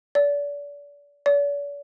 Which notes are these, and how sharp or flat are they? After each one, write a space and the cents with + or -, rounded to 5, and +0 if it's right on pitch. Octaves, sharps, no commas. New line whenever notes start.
D5 -35
D5 -45